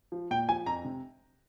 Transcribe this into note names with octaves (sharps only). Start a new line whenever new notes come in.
F3
A#2 G5
F3 G#5
F2 A#5
C3